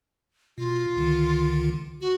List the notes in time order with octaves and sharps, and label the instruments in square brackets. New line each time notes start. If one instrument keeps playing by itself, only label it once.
[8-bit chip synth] B2 [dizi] F4
[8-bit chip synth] C#2 D3 D#3
[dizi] F#4